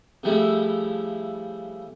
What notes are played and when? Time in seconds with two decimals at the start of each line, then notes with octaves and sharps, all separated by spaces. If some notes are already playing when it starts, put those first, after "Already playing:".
0.23 C#3 F3 G3 A3 E4